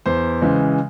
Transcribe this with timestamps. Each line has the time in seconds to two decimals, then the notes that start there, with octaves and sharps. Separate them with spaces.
0.06 E2 C5
0.42 C#3 E3 G#3